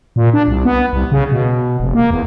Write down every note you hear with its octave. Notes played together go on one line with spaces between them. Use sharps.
A#2
D4
C2
B3
C2
C#3
B2
F1
A#3
E2